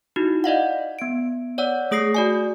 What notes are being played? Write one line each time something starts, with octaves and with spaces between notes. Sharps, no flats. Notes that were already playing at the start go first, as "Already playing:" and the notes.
D#4 E4 F#4
D5 D#5 F5 F#5
B3 D7
C#5 D5 F#5 E6
A3 G#4 D#6 A#6 C7
F#4 D5 G#5